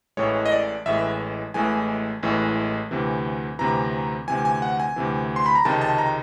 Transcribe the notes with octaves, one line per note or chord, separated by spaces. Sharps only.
A1 A2 E3 G#3 C#5
D#5
D5
A1 A2 E3 G#3 E5
A1 A2 E3 G#3 G#5
A1 A2 E3 G#3
D2 C3 E3
D2 C3 E3 A#5
D2 C3 E3 G#5
G#5
F#5
G#5
D2 C3 E3
C6
B5
A#5
C#2 C3 D#3 G#3 A5
A5
A#5